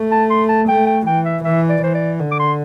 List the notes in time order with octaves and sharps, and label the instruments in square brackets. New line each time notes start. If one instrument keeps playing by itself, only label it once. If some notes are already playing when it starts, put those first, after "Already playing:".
Already playing: [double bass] A3
[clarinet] A5
C6
A5
[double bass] A3 [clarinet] G5
[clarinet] G5
[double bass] E3 [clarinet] G5
[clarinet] E5
[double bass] E3 [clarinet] E5
[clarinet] D5
[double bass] E3 [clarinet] C5
[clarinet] D5
[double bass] D3
[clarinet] D6
C6